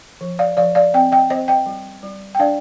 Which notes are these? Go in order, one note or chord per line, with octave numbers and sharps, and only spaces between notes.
F3
D5 F5
F3 D5 F5
D5 F5
C4 D#5 G5
D#5 G5
C4 C5 D#5
D#5 G5
G3
G3
G5
D4 D5 F5